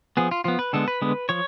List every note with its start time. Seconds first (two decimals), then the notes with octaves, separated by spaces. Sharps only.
0.17 F3 B3 G#4
0.31 F4
0.44 F3 B3 F4
0.59 B4
0.73 D3 G#3 B3 A4
0.88 B4
1.02 D3 G#3 B3
1.29 F3 C#5